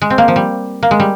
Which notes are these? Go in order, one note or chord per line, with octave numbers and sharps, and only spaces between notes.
G#3
C4
A#3
F3
G3
A#3
G#3
G3